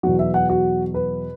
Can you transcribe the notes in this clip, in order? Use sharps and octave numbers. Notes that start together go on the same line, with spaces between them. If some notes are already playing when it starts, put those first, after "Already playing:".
E2 B2 F#3 F#4
E5
F#5
F#4
B4